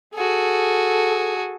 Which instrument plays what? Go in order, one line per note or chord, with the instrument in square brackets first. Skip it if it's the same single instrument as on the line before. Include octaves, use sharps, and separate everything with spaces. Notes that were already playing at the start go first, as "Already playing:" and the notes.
[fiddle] F#4 G#4 [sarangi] A4